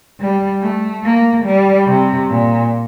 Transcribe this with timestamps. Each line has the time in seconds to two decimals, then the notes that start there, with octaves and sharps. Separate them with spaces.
0.20 G3
0.62 A3
1.05 A#3
1.46 G3
1.88 C3
2.30 A#2